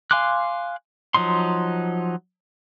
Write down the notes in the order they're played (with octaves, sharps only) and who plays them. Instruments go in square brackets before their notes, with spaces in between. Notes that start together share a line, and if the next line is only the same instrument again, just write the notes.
[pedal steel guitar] F5 G#5 C6 D6 F#6
F3 F#3 D#4 C6